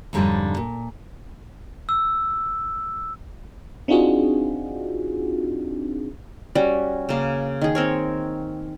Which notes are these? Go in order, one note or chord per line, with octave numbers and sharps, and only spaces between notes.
F2 G#2 D3 G3 C#4 D#4
A#2
E6
C4 D4 D#4 F4 F#4 G#4
G3 C#4 F#4
C#3 A#3
D#3 G#4
C4 A#4 C#5